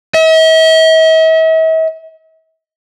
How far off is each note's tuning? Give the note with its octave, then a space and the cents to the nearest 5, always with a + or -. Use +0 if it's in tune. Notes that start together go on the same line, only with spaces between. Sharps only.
E5 -45